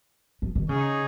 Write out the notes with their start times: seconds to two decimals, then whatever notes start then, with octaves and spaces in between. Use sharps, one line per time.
0.42 F3
0.55 D#3
0.69 C#3 D#4 G#4 C#5